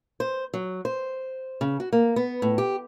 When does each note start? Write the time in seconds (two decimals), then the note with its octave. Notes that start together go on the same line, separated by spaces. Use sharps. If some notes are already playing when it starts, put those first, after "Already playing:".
0.20 C5
0.54 F#3
0.85 C5
1.61 C#3
1.80 F#4
1.93 A#3
2.16 B3
2.42 A2
2.58 G4